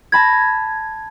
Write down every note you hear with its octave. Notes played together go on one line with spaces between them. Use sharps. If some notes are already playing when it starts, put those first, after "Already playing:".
A5 B5 G#6 A#6